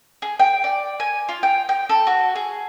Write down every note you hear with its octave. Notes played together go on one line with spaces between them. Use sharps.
G#4
G5
D5
G#5
F4
G5
G5
A4
F#4
G#4